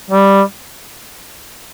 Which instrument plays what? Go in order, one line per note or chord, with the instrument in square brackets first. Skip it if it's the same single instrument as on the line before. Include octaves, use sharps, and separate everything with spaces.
[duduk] G3